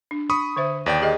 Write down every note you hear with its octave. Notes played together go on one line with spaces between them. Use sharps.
D4
B5 C#6 D#6
D3 C5 E5
D#2 B4 D5 G5
G4 G#4 D#5